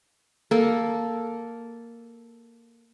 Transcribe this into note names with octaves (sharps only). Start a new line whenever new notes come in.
A#3 A4